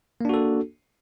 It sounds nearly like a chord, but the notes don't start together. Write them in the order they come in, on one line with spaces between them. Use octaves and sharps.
A#3 D4 F#4 A4